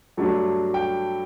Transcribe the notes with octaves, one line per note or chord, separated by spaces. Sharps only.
G2 F#3 A3 D4
G5